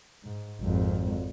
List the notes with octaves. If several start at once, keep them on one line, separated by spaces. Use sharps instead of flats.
G#2
G#1 F2